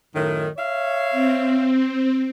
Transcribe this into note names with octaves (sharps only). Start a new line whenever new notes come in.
F#2 A2 D#3
C#5 E5 F5
C4